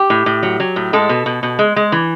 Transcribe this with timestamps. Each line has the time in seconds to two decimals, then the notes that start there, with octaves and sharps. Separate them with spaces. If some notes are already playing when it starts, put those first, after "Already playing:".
Already playing: G4
0.10 A2
0.26 A2
0.43 F#3
0.60 F#3
0.76 A2
0.93 G#3 A4
1.09 B2
1.26 B2
1.43 B2
1.59 G#3
1.76 G#3
1.92 E3